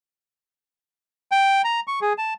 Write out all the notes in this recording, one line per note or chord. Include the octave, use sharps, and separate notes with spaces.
G5
A#5
C#6
G#4
A5